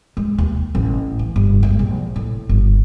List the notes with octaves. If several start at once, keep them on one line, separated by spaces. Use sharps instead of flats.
G#3
D#2
A1
E3
G1
G#3
A#1
A2
G1